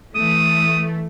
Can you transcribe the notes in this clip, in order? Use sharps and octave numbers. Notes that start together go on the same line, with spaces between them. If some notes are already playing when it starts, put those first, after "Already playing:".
E3 A3 D#6